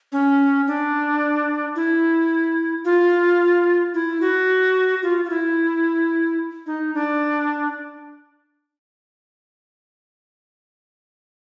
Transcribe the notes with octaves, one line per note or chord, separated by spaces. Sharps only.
C#4
D4
E4
F4
E4
F#4
F4
F4
E4
D#4
D4